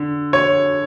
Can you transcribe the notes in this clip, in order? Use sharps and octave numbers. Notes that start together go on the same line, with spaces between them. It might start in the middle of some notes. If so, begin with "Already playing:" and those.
Already playing: D3
C#5